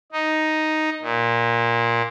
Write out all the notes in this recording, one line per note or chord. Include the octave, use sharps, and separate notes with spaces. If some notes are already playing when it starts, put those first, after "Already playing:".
D#4
A#2